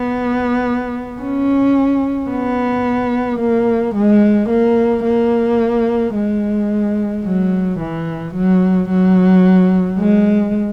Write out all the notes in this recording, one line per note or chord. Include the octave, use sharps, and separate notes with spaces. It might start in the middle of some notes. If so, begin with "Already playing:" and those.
Already playing: B3
C#4
B3
A#3
G#3
A#3
A#3
G#3
F#3
E3
F#3
F#3
G#3